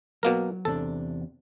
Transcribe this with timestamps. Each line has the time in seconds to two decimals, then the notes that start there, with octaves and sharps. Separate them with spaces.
0.23 B2 F#3 A#3 A#4
0.65 E2 C3 D4 A4